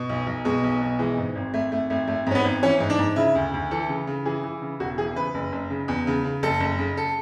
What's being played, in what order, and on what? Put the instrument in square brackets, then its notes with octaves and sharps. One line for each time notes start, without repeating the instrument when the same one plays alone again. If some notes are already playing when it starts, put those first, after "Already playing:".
Already playing: [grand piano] B2
B1
B1
B2 G#3
B1
B2
E3 G#3
G#2
G#1
G#1 A3
G#1 A3
G#1 A3
G#1 A3
G#2 C#4
B3
G#1
E3 C#4
G#2
D4
G#2
C#3 E4
D2
D2
E3 A4
C#3
C#3
E3 G#4
E3
C#3
E1 F#4
E3 G#4
C#3 B4
F#1
F#1
C#3
E2
C#3
C#3
F#1 A4
F#1
C#3
A4